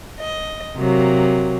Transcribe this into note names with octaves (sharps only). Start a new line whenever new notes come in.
D#5
C3 F#3 A#3